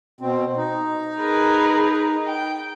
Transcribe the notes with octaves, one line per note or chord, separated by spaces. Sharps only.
B2 C4
D#4
G#4 A#4 B4
G5